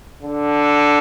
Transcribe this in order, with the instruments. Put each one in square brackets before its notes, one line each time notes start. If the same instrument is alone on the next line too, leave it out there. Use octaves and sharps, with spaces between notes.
[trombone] D3